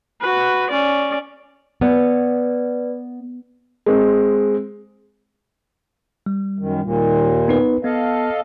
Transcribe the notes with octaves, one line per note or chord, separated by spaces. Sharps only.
F#4 B4
C#4 D5
B3 B4 D5
G#3 C4
G3
F#2 D#3
D#2 A#2
B3 D#4 B4
B3 A4 D#5 F5